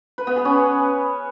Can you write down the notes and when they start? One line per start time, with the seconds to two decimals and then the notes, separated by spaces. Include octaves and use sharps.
0.18 B4
0.27 B3
0.36 G#4
0.45 C#4